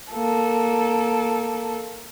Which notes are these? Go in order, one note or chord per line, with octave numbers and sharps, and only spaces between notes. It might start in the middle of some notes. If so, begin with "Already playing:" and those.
A#3 A4